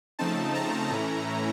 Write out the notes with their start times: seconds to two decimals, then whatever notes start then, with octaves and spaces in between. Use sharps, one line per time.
0.19 C#3 F3 A3 C4 D#4 A5
0.55 A#5
0.91 A2 E3 A3 C#4 E4